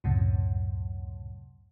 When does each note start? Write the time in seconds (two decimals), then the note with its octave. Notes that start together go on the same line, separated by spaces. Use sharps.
0.04 C#2 F#2 A2 C3